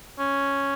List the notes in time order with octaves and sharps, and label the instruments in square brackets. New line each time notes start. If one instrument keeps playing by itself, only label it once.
[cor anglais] C#4